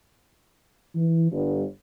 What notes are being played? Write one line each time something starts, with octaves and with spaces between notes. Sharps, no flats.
E3
G1